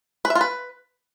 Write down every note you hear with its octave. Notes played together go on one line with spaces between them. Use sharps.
B4
E5
F4
B4